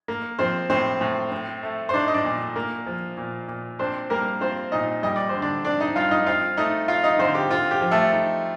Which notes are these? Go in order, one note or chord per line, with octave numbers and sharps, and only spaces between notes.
A#3
F3 C4 C5
A2 C4 C5
A2
C4
A3
C5
D4 D#4 D5
D#5
D4 D5
A#2
A#3
F3
A#2
A#2
C4 D4 C5
G3 A#3 A#4
C4 F4 C5
A#2 D#4 D#5
G3 D#5
D5
D3 C5
D4 D5
C4 D4 D5
D#4 D#5
G2 F4 F5
D#4 D#5
C4 F4 F5
A3 D#4 D#5
F4 F5
D#4 D#5
D3 C4 C5
G4
C4 F4
G4
F3
A3 A4
D#4